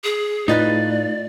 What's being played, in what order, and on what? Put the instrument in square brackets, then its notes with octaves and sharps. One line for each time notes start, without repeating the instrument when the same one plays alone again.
[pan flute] G#4
[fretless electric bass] A2 [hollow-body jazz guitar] D#4 F4 B4 [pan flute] D5